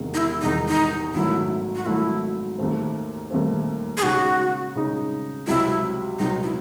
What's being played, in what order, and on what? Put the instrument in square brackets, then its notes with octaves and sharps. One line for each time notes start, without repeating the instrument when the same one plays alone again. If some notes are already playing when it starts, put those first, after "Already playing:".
Already playing: [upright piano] E1 E2 C3 D#3 G#3
[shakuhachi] D#4
E4
[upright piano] E1 E2 C3 D#3 G#3 [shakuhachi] D#4
[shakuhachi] D#4
[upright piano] G#1 G#2 D#3 F#3 A3 [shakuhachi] E4
[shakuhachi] F#4
[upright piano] G#1 G#2 D#3 F#3 A3 [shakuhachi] E4
[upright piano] D#2 D#3 A3 C4
D#2 D#3 A3 C4
[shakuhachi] G#4
[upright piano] C#3 G#3 D#4 [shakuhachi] F#4
[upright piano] C#3 G#3 D#4
[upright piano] C#2 C3 F#3 [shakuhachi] E4
[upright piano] C#2 C3 F#3 [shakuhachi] D#4
[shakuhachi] E4